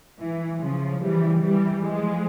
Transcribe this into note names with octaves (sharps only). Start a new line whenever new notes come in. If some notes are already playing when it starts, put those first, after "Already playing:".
E3
C#3 F3
E3 G3
E3 G3
F3 G#3